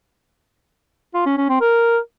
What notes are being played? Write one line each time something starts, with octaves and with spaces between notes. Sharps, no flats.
F4
C#4
C#4
C4
A#4